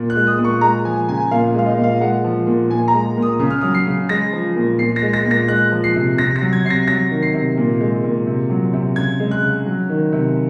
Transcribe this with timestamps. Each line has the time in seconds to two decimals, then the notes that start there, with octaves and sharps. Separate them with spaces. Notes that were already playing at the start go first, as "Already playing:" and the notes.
Already playing: A#2
0.10 F#6
0.16 G#3
0.27 D#6
0.39 A#2
0.44 C#6
0.61 G#3 A#5
0.85 F3 G#5
1.09 C#3 G#5
1.31 A#2 F5
1.54 G#3 F5
1.66 D#5
1.78 A#2
1.84 F5
2.01 G#3 F#5
2.24 F3
2.47 A#2
2.70 A#2 G#5
2.88 A#5
2.94 G#3
3.17 A#2
3.22 D#6
3.40 C#3 D#6
3.50 F6
3.61 F#3 D#6
3.74 C7
3.87 C#3
4.09 G#3 A#6
4.33 F3
4.56 A#2
4.79 A#2 C7
4.96 A#6
5.02 G#3
5.13 A#6
5.25 A#2
5.31 A#6
5.48 G#3 F#6
5.72 F3
5.84 C7
5.95 C3
6.18 C3 A#6
6.36 A#6
6.42 F#3
6.53 G#6
6.65 C3 C7
6.70 A#6
6.88 F#3 A#6
7.11 D#3
7.22 C7
7.34 C3
7.57 A#2
7.81 G#3
8.04 A#2
8.27 C3
8.50 F#3
8.73 C3
8.96 C#3 G#6
9.20 G#3
9.31 F#6
9.42 C#3
9.66 F#3
9.89 D#3
10.12 C3